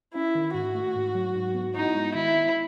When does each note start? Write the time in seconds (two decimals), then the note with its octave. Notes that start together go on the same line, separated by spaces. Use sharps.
0.15 C#4 E4
0.35 D#3
0.54 G#2 F#4
0.74 A3
0.95 G#2
1.15 F#3
1.35 G#2
1.55 B3
1.75 D#4 E4
1.95 G#3
2.15 D#3 E4
2.35 B3